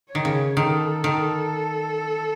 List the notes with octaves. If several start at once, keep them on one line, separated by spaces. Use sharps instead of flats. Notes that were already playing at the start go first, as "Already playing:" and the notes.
C#5
D#3
C#3
D#3 A4
D#3